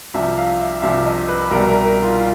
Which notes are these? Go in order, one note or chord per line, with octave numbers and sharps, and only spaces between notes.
C2 C3 F3 E5
F5
E5
C2 C3 F3 E5
D#5
B4
C2 B2 G3 A#4
A#4
A#4
F4
F4